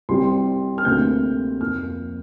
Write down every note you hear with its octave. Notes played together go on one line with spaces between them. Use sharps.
C2 C3 G3 C4 C6
F6
D2 C3 A#3 G6
F2 F3 A#3 F6